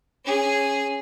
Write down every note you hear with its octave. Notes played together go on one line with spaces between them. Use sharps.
C#4 G#4